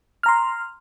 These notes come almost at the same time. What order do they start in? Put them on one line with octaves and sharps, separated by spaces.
F6 A#5 C6